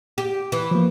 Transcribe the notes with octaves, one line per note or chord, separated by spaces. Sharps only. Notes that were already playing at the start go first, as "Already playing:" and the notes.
G4
E3
F3 A#3